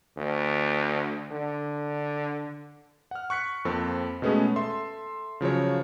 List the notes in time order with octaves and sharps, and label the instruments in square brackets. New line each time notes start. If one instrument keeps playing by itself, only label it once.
[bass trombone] D2
D3
[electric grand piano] F#5 F6
C#6 F#6 B6 C#7
F2 A#3 C4 A4
B2 G#3 A3 B3 C#4 G#4
A4 E5 C6
C#3 F3 F#3 C#5